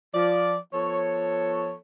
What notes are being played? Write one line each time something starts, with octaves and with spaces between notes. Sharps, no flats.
F3 D5
F3 B3 A4 C#5